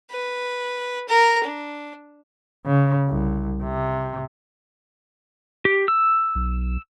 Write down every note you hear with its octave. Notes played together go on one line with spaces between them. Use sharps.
B4
A#4 A#5
D4
C#3
C2
C3
G4
E6
B1